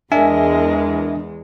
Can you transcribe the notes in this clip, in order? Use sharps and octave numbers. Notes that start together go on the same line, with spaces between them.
E2 G#3 D4 A#4 D#5 E5 G#5